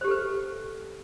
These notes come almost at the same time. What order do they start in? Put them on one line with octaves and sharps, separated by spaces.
C5 G4 A4 B4